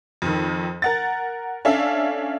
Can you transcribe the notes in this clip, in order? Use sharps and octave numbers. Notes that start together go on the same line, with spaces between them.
F2 D#3
A#4 F#5 A6
C#4 D4 A4 E5 F5